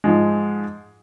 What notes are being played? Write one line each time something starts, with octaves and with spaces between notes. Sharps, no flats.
G#2 F3 G#3